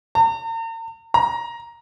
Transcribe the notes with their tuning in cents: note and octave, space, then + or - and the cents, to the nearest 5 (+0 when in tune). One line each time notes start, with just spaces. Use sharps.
A#5 -45
A#5 +10